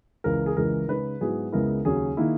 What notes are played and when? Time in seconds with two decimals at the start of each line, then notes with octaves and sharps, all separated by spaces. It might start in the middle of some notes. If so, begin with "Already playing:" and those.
0.24 C#2 C#3 E3 A#4
0.46 G#4
0.57 C#2 C#3 E3 G#3 A#4
0.88 C#3 G#3 D#4 B4
1.21 G#2 F#3 B3 E4 G#4
1.52 C#2 C#3 G#3 B3 E4 A#4
1.85 D#2 C#3 F#3 C#4 G#4
2.17 D#3 A#3 E4